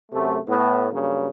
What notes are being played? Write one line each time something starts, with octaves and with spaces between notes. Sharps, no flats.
F#2 C3 A3
A2 B3
G2 C#3 F#3 A#3